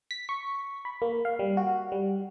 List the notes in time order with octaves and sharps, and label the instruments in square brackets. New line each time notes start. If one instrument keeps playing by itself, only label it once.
[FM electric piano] B6
C#6
B5
A#3
F5
G3
F#4
G3